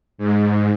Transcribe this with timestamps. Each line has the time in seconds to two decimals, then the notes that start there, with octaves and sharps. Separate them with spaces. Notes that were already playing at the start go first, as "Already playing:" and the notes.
0.18 G#2